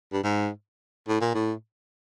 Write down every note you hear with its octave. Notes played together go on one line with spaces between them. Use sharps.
G2
G#2
A2
A#2
A2